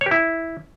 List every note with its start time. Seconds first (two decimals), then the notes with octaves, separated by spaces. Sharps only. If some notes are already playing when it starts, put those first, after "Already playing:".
0.01 C#5
0.06 G4
0.11 E4